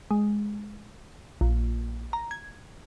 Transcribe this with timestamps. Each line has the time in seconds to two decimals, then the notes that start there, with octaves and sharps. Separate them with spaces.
0.11 G#3
1.41 A#1
2.13 A#5
2.31 G#6